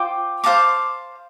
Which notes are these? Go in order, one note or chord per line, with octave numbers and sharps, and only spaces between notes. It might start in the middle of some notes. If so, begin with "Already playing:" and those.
Already playing: F4 C5 G5 D6
C5 F5 A5 D6